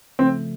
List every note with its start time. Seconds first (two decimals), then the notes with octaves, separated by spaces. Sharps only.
0.19 C#3 F3 A3 C4